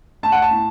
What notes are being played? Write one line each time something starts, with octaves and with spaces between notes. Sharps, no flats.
A3 A5
F#5
A5
A2